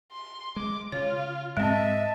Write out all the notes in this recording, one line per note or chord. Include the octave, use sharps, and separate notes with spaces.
C6
G#3 D6
C#3 F4 C#5
G#2 G#3 C4 D#5 E5 A5